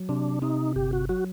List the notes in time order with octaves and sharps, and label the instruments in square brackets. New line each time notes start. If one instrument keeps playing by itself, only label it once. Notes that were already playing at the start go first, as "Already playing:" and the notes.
Already playing: [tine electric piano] F#3
[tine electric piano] C3 [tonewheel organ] D4
[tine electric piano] C3 [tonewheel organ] D#4
[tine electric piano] G1 [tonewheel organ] G4
[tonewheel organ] F#4
[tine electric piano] F#3 [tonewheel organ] F#4